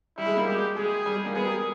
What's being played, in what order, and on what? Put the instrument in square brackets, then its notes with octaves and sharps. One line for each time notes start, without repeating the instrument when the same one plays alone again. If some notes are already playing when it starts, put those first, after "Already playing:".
[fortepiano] G3 [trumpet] E4
[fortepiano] G#3
G3 A#3
[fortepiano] G#3 [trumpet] G4
[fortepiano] G#3
[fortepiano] G#3 [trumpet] G#4
[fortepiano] G3
G#3
G3 A#3
[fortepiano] G#3 B3 [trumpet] G#4
[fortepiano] G4 A#4